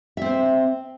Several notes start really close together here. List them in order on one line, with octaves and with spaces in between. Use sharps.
E5 C4 C5